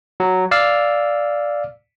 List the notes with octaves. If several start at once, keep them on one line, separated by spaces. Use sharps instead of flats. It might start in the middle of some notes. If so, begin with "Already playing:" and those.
F#3
D5 F5 E6